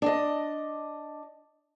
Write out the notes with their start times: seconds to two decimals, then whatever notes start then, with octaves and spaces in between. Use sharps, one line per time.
0.02 D4 D#5